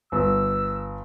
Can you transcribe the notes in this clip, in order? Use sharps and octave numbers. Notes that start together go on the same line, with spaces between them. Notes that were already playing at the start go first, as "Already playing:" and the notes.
G1 E6